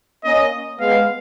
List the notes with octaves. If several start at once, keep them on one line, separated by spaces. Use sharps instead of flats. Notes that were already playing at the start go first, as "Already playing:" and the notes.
A#3 C#4 D#5
G#3 B3 F5